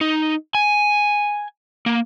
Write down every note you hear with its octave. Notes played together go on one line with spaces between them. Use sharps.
D#4
G#5
A#3